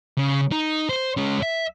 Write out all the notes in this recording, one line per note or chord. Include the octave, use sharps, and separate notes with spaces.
C#3
D#4
C5
G#3 C#4
E5